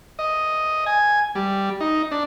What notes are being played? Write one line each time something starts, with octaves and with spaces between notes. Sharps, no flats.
D#5
G#5
G3
D#4
D4